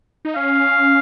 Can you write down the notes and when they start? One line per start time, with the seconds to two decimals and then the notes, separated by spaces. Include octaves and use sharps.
0.25 D#4
0.36 C#4 F5